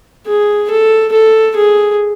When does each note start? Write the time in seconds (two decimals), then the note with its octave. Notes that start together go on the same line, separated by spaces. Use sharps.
0.27 G#4
0.70 A4
1.12 A4
1.56 G#4